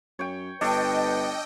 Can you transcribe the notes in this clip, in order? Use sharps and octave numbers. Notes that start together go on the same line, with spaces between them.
F#2 C#5 G5
G1 D4 A4 B4 C#5 D#5 G5